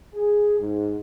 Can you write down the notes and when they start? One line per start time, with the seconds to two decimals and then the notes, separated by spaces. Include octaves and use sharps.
0.15 G#4
0.59 G#2